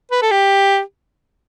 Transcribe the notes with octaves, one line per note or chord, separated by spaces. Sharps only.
B4
A4
G4